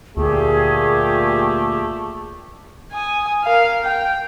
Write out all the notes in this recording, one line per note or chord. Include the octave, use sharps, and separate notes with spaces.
D2 A#2 A3 G4 G#4
G#5 D#6
A#4 F5
G5